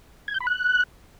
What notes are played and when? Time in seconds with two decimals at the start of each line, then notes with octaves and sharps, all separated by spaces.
0.28 G#6
0.34 G6
0.40 B5
0.47 F#6